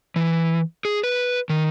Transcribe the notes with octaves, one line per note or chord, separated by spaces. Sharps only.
E3
G#4
B4
D#3